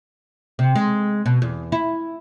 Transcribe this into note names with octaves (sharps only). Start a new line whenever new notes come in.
C3
G#3
B2
E2
E4